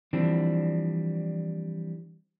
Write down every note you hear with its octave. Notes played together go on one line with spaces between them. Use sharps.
E3 F3 G3 C4 D4